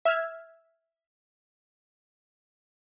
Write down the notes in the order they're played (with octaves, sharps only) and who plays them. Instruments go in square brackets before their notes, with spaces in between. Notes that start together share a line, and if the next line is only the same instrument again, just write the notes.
[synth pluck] E5 E6 F6 G#6